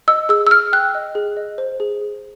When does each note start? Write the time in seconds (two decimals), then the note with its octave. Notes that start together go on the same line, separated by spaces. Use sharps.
0.08 D#5 E6
0.29 G#4 E6
0.47 E6
0.51 G#4 F6
0.73 G5 F#6
0.95 D#5
1.15 G#4
1.37 D#5
1.58 C5
1.80 G#4
2.01 G#4